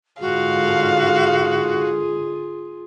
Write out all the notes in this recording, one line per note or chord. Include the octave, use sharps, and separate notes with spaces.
G#2 D3 F4 F#4 G#4 F5